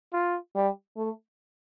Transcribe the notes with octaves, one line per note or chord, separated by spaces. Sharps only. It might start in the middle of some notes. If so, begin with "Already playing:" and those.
F4
G3
A3